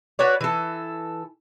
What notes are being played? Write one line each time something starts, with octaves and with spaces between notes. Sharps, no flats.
F#4 B4 C#5 D5
E3 A4